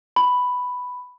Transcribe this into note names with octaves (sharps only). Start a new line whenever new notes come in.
B5